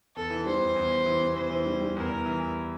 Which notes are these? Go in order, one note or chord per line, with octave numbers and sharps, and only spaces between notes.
E2 A4
E3
G3 C5
E2
E2
E2
E3
E2
E2 C5
E3
G3
G3
E2 A#4
E2
E3
E2